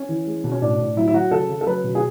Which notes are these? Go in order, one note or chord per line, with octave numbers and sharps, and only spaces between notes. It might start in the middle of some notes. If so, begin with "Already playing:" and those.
Already playing: C#4
E3
G#3
B2
C#4
A2 D4
A2
F#3 E4
E4
F#3 F#4
C#3 A4
C#3
A4
F#3 B4
B2
G#4